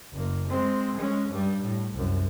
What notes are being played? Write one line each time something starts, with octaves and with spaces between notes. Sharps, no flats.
F#1 A#3
G#3 C4
G#3 C#4
G2 G3
A2
C2 F#2